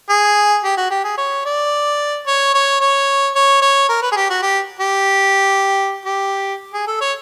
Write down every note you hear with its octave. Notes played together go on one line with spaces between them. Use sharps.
G#4
G4
F#4
G4
G#4
C#5
D5
C#5
C#5
C#5
C#5
C#5
A#4
B4
G#4
G4
F#4
G4
G4
G4
G#4
A4
C#5